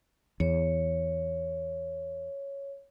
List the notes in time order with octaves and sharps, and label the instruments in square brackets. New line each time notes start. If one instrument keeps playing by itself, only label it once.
[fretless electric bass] E2 [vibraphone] C#5